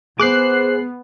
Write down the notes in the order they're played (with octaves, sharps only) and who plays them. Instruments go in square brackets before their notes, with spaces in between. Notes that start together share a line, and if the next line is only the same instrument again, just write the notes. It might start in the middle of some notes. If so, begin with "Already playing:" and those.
[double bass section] B3 [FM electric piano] G#4 F#6 C7 [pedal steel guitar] C5 D6